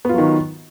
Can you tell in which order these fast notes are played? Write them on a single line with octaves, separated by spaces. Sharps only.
B3 F4 F#3 D#3